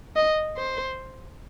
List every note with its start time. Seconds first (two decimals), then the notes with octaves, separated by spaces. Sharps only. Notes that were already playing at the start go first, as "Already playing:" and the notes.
0.16 D#5
0.57 C5